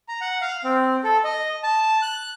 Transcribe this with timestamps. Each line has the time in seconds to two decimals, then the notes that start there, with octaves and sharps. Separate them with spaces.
0.09 A#5
0.21 F#5
0.41 F5
0.64 C4
1.04 A4
1.24 D#5
1.63 A5
2.02 F#6